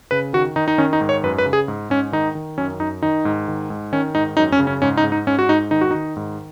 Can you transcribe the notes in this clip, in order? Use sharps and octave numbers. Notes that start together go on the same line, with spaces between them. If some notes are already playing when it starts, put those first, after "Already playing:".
C#3 B4
D#3 F#4
D#3 D#4
D#4
D#3 C#4
D#4
G#2
C#5
F#2 B4
B4
C#3
G#4
G#2
G#2 C#4
D#3 D#4
D#3
F#2 C#4
F#2 D#4
D#3 D#4
G#2
D#3
G#2
D#3 C#4
G#2 D#4
F#2 D#4
C#4
C#3
C#4
G#2 C#4
D#4
G#2
D#4
G#2 C#4
F#4
G#2 D#4
D#3 D#4
F#4
D#3 D#4
G#2